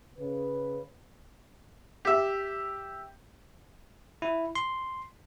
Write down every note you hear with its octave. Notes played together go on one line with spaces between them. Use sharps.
C#3 B4
G4 E5
E4
C6